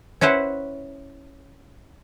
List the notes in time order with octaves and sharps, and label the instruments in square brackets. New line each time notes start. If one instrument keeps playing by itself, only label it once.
[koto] C#4 E4 B4 C5 F#5